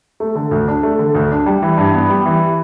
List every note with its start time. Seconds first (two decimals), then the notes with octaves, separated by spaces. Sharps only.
0.20 A3
0.35 D3
0.51 D2
0.68 D4
0.83 A3
0.99 D3
1.15 D2
1.31 D4
1.46 G3
1.62 E3
1.78 G2
1.94 B3
2.10 G3
2.26 E3